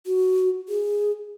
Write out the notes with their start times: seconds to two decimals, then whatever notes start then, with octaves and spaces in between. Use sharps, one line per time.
0.06 F#4
0.68 G#4